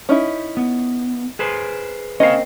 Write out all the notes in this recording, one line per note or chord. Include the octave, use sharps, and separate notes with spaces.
C#4 D#4 E4
B3
G#4 B4 C5
A#3 C4 C#4 D#5 F5